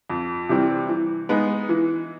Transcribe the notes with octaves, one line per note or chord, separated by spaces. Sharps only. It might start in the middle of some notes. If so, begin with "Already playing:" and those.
F2
C3 E3 G3 C4
E3
G#3 B3 D#4
E3